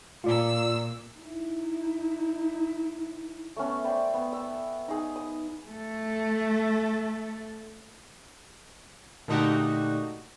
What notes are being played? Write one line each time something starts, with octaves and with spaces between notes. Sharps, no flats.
A#2 F4 D5 E6
D#4 E4
A3 B3 C#4
C5 D5 G5 B5
B3
E6
D#4 G#4
D#6
A3 A4
A#2 D3 A3 D#4 F#4 G4